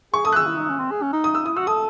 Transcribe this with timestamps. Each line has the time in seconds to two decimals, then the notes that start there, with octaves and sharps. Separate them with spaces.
0.14 G#4 C#6
0.25 A4 D#6
0.32 F#6
0.36 G#4 E6
0.46 E4
0.57 D#4
0.69 C#4
0.79 C4
0.91 G#4
1.02 C#4
1.13 D#4
1.24 D#6
1.35 E6
1.46 E4 D#6
1.56 F#4 E6
1.67 A4 D#6